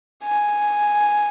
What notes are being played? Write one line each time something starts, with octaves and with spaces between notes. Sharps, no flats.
G#5